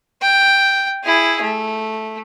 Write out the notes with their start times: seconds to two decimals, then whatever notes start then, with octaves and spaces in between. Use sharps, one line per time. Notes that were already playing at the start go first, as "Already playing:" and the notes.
0.22 G5
1.04 E4 G#4
1.42 A3